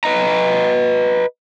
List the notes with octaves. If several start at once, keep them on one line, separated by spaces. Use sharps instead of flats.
B4 D#5 A#5